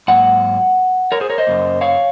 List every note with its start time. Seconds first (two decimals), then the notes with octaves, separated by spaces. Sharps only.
0.08 G#2 F#3 A#3 F#5
1.12 A#4 C#5
1.20 G#4 C5
1.30 A#4 C#5
1.38 C5 D#5
1.47 F#2 C#3 F#3 A#3
1.81 C#5 F5